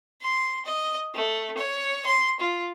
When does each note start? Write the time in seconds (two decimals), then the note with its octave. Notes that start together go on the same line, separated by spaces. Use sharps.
0.22 C6
0.65 D#5
1.14 A3
1.57 C#5
2.06 C6
2.40 F4